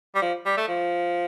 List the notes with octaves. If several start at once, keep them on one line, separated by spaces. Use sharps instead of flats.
G3
F3
G3
A3
F3